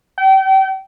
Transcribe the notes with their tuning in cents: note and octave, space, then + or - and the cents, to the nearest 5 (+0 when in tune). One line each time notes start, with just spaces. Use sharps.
G5 -35